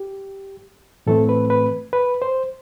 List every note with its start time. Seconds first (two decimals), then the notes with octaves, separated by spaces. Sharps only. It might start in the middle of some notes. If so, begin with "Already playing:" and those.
Already playing: G4
1.07 A2 E3 A3 C4 A4
1.29 B4
1.50 B4
1.93 B4
2.22 C5